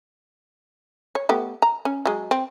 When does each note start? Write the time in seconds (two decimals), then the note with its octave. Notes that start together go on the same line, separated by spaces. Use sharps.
1.15 C#5
1.29 A3 B3 G4
1.62 A#5
1.85 C#4
2.06 F#3 G#3
2.31 C4